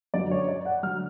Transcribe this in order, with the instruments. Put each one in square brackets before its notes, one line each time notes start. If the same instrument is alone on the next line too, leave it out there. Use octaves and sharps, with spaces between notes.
[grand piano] F#2 D3 F#3 D5
C#5
D5
F#5
D3 F#3 F6